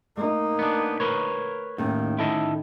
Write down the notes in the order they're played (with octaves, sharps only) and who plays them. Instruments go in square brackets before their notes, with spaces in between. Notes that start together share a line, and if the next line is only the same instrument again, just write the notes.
[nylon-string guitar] A3 [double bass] A#3 D#4
[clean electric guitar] B3 D4
A#4 B4 C#5
[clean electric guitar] D#2 [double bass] A2 [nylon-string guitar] D#3 C#4
[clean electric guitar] E4 A4 D#5